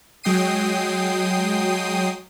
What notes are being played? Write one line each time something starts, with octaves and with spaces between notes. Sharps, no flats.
F#3 G#3 G5 D#6 C7 D#7